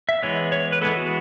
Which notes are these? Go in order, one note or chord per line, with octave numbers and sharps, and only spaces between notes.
E5
E3 G#3 B3 C#5
C#5
B4
E3 G#3 B3 A4
F#4